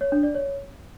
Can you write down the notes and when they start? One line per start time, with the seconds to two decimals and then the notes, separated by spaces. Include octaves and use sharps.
0.01 C#5
0.12 D4
0.23 D5
0.35 C#5